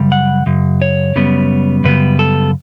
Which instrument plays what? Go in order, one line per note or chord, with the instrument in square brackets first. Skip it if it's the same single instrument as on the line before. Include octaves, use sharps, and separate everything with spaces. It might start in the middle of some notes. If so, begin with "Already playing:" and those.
Already playing: [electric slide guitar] F#2 C#3 G3
F#5
F#2 C#3
C#5
F#2 C#3 G3 B3
F#2 C#3 G3 B3 B4
A4